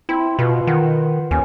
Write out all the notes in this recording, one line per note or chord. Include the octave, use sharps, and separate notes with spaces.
C4 E4
B2 F4 B4 C5
D#3 F#5
D#2 C#4 D5